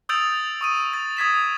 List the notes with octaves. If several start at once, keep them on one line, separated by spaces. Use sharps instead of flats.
D#6 E6 G6 A6 D7 F7
C#6 D#6 D#7
A6
D#6 G#6 B6 E7